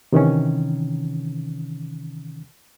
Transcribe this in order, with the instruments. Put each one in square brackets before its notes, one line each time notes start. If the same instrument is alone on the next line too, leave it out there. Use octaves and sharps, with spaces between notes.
[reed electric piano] C3 D#3 E3 C#4